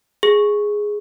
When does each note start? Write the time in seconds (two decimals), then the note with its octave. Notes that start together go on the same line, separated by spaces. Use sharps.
0.23 G#4